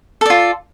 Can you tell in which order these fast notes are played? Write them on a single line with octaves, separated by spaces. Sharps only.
A4 D5 F4